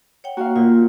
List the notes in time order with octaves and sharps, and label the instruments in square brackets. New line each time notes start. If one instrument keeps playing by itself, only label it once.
[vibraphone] C#5 F#5 G5
[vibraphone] A#3 F#5 [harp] F#4 F5
[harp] A#2 G6 [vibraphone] F4